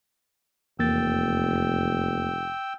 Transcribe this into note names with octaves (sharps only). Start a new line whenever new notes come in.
F1 E2 A#3 G5 E6 A6